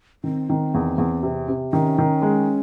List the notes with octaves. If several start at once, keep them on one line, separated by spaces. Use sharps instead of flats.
D#3 C4
D#3
E2
E2
C3
C3
D#3 C#4
D#3
G#3